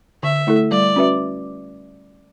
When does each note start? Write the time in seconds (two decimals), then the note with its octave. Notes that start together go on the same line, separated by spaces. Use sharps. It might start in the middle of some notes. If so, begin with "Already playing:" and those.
0.23 D3 E5
0.47 A3 E4 A4
0.71 G3 D5
0.96 C#4 F#4 B4 E5